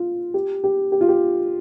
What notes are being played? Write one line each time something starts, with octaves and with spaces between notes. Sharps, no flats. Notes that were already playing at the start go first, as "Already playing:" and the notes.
Already playing: F4
G4
G4
G4
F4
G4